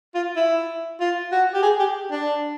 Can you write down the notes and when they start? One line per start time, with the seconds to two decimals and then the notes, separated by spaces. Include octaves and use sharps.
0.15 F4
0.36 E4
1.00 F4
1.32 F#4
1.54 G4
1.63 G#4
1.79 G4
2.11 D4